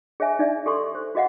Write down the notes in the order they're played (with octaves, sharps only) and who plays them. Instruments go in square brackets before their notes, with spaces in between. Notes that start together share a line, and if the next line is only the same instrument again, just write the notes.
[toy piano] G#4 C#5 D#5 E5 G#5
D#4 D5 E5
G4 A4 C6 C#6
C5
F#4 G#4 D#5 F5 F#5